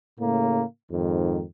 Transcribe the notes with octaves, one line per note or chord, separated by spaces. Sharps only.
A2 C#3 A#3
F2 G#2 D#3